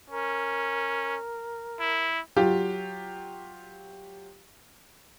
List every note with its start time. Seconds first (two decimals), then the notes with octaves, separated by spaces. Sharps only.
0.11 C#4 A#4
1.80 E4
2.36 F#3 F4 G4